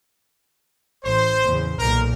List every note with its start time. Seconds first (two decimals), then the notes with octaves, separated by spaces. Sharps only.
1.04 A1 C5
1.44 E2 C#3
1.79 B1 A#2 A#4